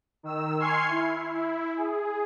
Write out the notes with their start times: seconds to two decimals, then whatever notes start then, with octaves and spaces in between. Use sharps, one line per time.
0.23 D#3 E6
0.60 G#5 C6 C#6 F6 G#6 C7
0.89 E4
1.34 E4
1.77 G#4